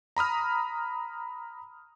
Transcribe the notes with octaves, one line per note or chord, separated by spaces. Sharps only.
A#5 B5 D#6 F6